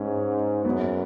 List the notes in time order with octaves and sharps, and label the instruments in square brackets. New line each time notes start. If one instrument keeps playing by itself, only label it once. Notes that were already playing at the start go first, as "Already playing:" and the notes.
Already playing: [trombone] G#2 [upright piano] C#4
[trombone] F#2 [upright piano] B3